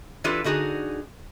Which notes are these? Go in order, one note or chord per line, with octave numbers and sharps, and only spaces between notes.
E3 D4 F4 G4 A4 B4
D3 D#4 F#4 G#4